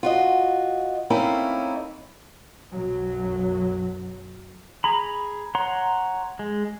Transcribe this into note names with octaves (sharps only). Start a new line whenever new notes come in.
F4 F#4 D#5
A3 A#3 C4 C#4 D#4 E4
B1 F#2 F#3
G#4 A#5 B5
C#5 F#5 A#5 C6
G#3